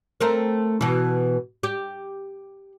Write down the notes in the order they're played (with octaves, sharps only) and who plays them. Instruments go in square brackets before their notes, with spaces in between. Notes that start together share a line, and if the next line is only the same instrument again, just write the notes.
[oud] A3 C4 A#4
B2 E3
G4